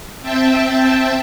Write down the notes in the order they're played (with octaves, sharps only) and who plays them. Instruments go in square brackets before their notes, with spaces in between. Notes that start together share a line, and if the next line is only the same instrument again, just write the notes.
[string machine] C4 E5 G5 A5